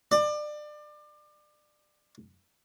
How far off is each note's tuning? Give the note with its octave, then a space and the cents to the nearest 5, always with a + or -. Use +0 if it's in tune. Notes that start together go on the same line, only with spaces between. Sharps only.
D5 +30